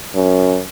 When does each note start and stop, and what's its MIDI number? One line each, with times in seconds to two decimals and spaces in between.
0.15 0.60 42